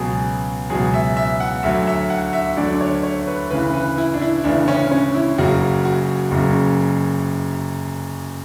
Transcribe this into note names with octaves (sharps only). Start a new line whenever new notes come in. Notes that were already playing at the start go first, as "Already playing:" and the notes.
Already playing: C#2 B2 F#3 G#4
C#2 B2 F#3 G#4
E5
E5
F#5
D2 D3 F#3 E5
E5
F#5
E5
D2 D3 F#3 D5
C#5
C#5
B4
D2 C#3 E3 B4
B4
E4
D4
E4
D2 C#3 E3 D4
C#4
C#4
E4
F#1 F#2 C#3 F#4
F#4
F#1 F#2 C#3